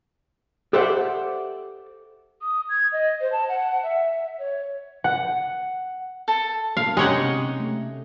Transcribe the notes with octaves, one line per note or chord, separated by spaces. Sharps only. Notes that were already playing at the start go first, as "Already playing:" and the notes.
G4 A4 C5 D5 E5 F#5
D#6
G#6
D#5
C5
A5
F#5
E5
C#5
F#5
A4 A5
B2 A#3 F5
G#3 C#4 D#4 G4 C#5 D#5 F#5
C3
A3